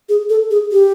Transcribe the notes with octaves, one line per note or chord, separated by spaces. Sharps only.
G#4
A4
G#4
G4